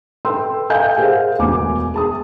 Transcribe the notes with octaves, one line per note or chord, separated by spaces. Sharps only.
A4 B4 G5 C6 E6
A4 D#5 F5 G5 G#5 G6
G4 G#4 A#4 C5 F5 F#5
E1 D2 B3 G#5 D6
G#4 A5 D#6